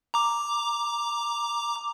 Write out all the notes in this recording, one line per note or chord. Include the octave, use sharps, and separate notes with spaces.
A#5 D6